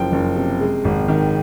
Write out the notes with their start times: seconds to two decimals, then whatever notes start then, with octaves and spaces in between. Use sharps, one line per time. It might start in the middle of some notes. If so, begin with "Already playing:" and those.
Already playing: F#1 F3 G5
0.12 F#1
0.36 C3
0.60 G#3
0.84 G#1
1.08 D#3